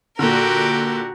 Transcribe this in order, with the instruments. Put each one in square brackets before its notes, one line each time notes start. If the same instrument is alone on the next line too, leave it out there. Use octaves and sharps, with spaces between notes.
[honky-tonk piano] A#2 D3 [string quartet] F#4 G4 A#4